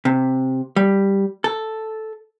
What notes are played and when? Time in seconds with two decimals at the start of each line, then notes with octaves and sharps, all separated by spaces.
0.05 C3
0.76 G3
1.44 A4